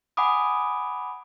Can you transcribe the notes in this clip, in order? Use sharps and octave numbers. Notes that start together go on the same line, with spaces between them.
F#5 G#5 B5 D6 D#6